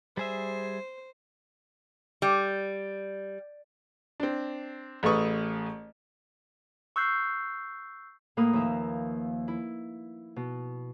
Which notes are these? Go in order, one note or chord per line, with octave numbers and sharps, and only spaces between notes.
G3 G#4 C5 E5
G3
C4 D4
A1 A3 G#4 B4 C#6 D#6
C#6 E6 F#6 G6 C7
A2 A#3 A#4 B4 D#6
D#2 F3 E5
E4
B2